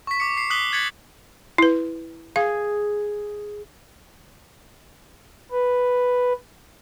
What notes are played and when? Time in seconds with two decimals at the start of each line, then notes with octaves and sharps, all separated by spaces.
0.07 C#6 B6
0.20 D6 C#7
0.37 B6 C7
0.50 D6 D#6 F#6 B6 F#7 G7
0.72 F#6 G#6 A6 B6 C#7 F#7
1.58 E4 B4
2.36 G#4 F5
5.51 B4